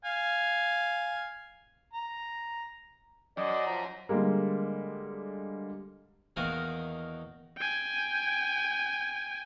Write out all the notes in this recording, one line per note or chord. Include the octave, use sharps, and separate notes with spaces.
F5 G#5
A#5
F#2 D5 D#5
F3 A#5
D3 G3 G#3 A#3
E2 D#3 A#3 F#4 A#4 D#6
G5 G#5